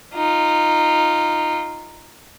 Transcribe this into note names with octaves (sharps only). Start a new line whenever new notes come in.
D#4 F4